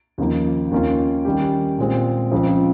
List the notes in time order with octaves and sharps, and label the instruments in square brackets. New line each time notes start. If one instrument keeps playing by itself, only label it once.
[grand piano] D#2 C#3 F3 A#3 D#4
D#2 D#3 A#3 C#4 F4
D#3 G3 C#4 G4
A#2 G#3 C4
C#2 C#3 F3 C4